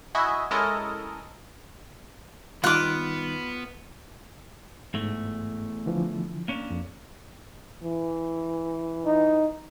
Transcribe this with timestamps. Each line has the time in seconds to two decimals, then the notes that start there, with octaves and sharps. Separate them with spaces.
0.15 E4 F#4 D#5 E5 G#5
0.51 G#3 C#4 E4 A4 A#4 D#5
2.64 D#3 G3 B3 D#4 F4 D6 F#6
4.94 E2 G#2 A3
5.86 D3 E3 F3
6.48 A#3 C#4 D4
6.70 F2
7.83 E3
9.06 D#4